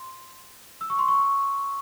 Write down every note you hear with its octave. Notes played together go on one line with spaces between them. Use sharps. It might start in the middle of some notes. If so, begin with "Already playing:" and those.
Already playing: C6
E6
C#6
C6
C#6